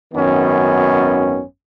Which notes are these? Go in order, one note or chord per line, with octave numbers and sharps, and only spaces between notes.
G#1 F#2 D#3 B3 C#4